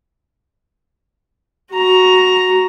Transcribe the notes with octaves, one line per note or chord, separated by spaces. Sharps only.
F#4 A#5